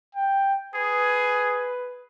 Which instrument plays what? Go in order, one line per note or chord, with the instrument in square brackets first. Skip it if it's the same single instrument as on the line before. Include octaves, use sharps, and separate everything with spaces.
[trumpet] G5
[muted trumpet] G#4 [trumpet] B4